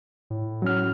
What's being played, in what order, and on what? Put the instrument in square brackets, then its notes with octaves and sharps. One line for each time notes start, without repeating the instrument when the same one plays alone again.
[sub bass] A2
[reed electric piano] F#3 C#4 F6